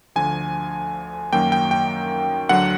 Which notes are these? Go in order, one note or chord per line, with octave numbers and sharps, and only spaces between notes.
D2 D3 F3 G#5
F#2 D#3 F#3 A#3 G5
G5
G5
D2 D3 F#3 F#5